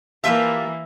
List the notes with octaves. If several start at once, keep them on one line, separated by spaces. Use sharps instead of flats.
E3 A#3 F4 G4 A4 E5